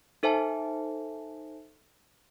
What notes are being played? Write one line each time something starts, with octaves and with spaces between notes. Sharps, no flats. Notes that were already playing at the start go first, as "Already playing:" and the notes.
D#4 A4 C5 E5 G#5 A5